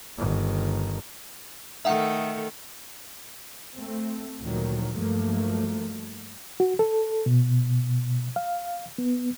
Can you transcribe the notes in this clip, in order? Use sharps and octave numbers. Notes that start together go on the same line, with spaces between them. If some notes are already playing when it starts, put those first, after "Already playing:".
G1 D#3
D#3 A3 A4 E5 F#5
A3 C4
D2 A#2 D#3 F3 F#3
G2 F3 F#3 A3 A#3
F#4
A4
B2
F5
B3